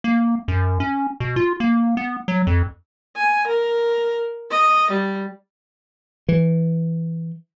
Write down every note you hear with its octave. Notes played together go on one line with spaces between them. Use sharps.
A#3
F#2
C#4
B2
F4
A#3
B3
F#3
F2
G#5
A#4
D#5
G3
E3